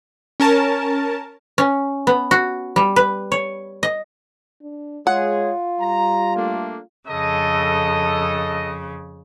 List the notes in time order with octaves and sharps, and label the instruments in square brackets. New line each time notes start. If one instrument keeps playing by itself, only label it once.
[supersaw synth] C#4 A#4 A5
[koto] C#4
B3
F#4
G3
B4
C#5
D#5
[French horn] D4
[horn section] G#3 G#4 [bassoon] F4 [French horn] C#5 [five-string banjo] F#5
[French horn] G3 [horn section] A#5
[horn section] A3 A#3 D4
[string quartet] F2 C#3 [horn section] A4 D#5